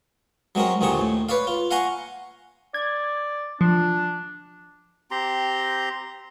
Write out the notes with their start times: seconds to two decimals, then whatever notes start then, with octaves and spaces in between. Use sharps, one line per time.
0.55 F#3 G#3 C4 C#4 A#4
0.81 D#2 A#2 D3 C4 G#4 C#6
1.01 A2
1.29 B4 C#5 D5 F5
1.47 F4
1.71 F5 F#5 G#5 A#5 C6 C#6
2.74 D5 G#6
3.61 F3 D4
5.11 C4 G4 A#5 C6